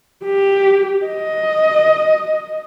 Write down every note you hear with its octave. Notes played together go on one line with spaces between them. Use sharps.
G4
D#5